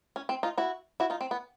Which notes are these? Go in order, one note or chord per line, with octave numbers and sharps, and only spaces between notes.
C#4
C4
D#4 F4
E4 F#4
E4 F#4
D#4 F4
C4
B3